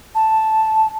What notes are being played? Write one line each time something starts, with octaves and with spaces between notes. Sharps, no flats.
A5